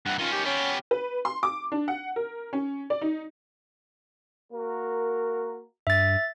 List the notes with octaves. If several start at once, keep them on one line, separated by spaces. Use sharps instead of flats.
G2 E3 F#5
D#3 C#4 F4
G4
B3 C#4 G4
B4
C6
D6
D4
F#5
A#4
C#4
D5
D#4
A#3 F#4 A#4
G2 E5 A6